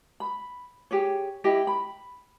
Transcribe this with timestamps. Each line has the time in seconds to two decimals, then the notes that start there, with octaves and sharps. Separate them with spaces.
0.20 B5
0.91 G4 G#4 C#5
1.44 E4 G4 D#5
1.67 B5